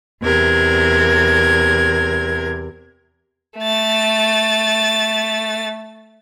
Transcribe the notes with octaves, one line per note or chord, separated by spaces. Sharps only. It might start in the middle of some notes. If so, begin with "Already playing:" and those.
E2 C3 A#4 G#6
A3 A6